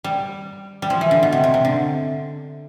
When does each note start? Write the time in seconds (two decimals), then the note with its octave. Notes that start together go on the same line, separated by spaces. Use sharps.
0.04 G3
0.82 G3
0.90 F3
1.01 E3
1.11 D3
1.23 B2
1.32 C3
1.44 C3
1.54 C3
1.65 D3